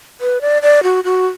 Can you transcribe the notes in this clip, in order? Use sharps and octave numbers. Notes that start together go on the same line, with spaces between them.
B4
D5
D5
F#4
F#4